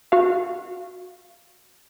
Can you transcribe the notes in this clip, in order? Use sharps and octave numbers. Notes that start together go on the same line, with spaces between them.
F#4 F5